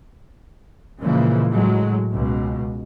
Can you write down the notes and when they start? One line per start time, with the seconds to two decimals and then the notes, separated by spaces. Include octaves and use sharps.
1.01 A#2 C#3 E3 F3 G#3 A#3
1.51 A2 F#3 G#3
2.11 C#2 B2